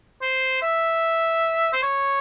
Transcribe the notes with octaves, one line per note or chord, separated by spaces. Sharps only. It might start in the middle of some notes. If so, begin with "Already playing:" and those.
C5
E5
C5
C#5